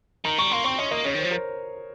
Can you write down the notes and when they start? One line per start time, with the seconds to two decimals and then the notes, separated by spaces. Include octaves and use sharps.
0.25 D#3 A#5
0.38 G3 C#6
0.52 A#3 C6
0.64 C4 C#6
0.78 C#4 D#5
0.91 A#3 D#5
1.05 C#3 C#5
1.15 D#3 C5
1.25 F3
1.31 A#4